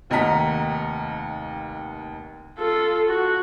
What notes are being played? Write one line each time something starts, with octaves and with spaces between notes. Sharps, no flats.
F1 D#2 D#5 F#5 A#5 B6
F4 A4
F#4